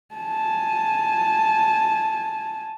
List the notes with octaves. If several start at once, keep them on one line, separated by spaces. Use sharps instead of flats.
G#5 A5